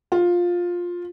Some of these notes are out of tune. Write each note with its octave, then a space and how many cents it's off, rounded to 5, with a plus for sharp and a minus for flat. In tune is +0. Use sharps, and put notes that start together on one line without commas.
F4 +10